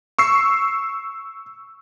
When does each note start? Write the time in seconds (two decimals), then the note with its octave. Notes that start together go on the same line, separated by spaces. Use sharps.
0.18 C#6 E6 C7